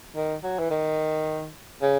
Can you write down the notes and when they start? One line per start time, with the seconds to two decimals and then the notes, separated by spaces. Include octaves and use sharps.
0.16 D#3
0.43 F#3
0.59 E3
0.71 D#3
1.82 C#3